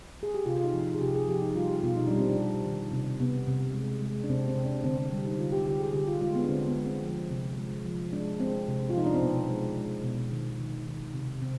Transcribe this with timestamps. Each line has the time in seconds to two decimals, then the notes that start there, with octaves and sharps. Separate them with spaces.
0.23 G#4
0.34 G4
0.46 C3 F4
0.56 F4
0.64 D#4
0.74 F3
0.82 D#4
0.95 G#4
1.01 C3 G4
1.15 G#4
1.28 F3 G4
1.42 D#4
1.55 G3 F4
1.69 G4
1.83 B2 F4
1.97 D#4
2.07 G3 D4
2.19 C4
2.30 D4
2.38 G3
2.65 D#3
2.92 C3
3.20 C3 B3
3.47 C3
3.74 G#3
4.02 G#3
4.24 D4
4.29 C3 C4
4.48 C4
4.56 C3
4.65 D4
4.84 D3 C4
4.98 C4
5.12 G3
5.25 D#4
5.39 D3 F4
5.52 G4
5.66 D3 G4
5.80 G#4
5.93 D3 G4
6.07 F4
6.21 G#3 F4
6.35 B3
6.44 D4
6.49 D3 C4
6.59 C4
6.67 B3
6.76 G#3
6.85 C4
7.03 F3
7.30 C3
7.58 G#3
7.86 F3
8.13 G#3 D4
8.40 G#3 C4
8.68 C3
8.90 F4
8.95 F3 D#4
9.06 D4
9.14 C4
9.22 B2 B3
9.50 G#3
9.77 G#3
10.04 B2
10.31 D#3
10.59 D#3
10.87 D#3
11.14 C3
11.41 C3 C4